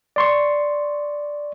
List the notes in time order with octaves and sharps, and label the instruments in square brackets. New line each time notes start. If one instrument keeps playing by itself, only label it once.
[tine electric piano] D5 C6 C#6